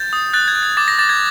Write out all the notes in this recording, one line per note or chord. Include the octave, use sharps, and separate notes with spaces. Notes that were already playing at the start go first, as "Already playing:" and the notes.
Already playing: G6 A6
D#6
F#6 A6
G#6
F#6
G#6
D6 A6
A#6
D6 A6
G#6